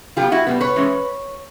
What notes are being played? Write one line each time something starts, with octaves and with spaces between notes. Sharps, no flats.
D3 F#3 B3 F4 G4
E4 F#4
B2 G3 B3
B4 C#5
E3 G#3 C#4